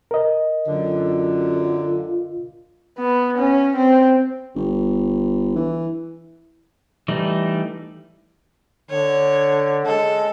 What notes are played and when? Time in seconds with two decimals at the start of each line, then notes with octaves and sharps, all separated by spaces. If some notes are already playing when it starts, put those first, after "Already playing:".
0.11 A#4 D#5
0.67 F#2 D3 F4
2.99 B3
3.38 C#4
3.76 C4
4.55 G1
5.56 E3
7.08 E3 G3 A3 D#4
8.91 D3 C#5
9.85 G#3 A4